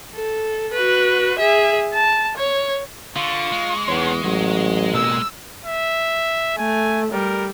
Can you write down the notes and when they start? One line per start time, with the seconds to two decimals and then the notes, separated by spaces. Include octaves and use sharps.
0.15 A4
0.73 F#4 B4
1.39 G#4 E5
1.94 A5
2.38 C#5
3.16 D3 F4 C#6
3.52 G#3
3.88 E2 B3 C#5
4.24 A1 F#3
4.94 B2 A#3 E6
5.65 E5
6.58 A3 G#5
7.12 G3 A#4